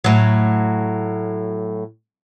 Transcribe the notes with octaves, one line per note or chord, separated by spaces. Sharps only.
A2 F#3